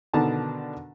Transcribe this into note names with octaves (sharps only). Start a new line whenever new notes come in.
B2 D3 D#3 D4 A5 A#5